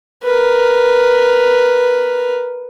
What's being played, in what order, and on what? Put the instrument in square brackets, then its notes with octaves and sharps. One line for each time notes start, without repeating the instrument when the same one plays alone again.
[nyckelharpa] A#4 B4